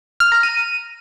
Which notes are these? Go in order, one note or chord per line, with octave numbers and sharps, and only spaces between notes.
F6
A#5
D#7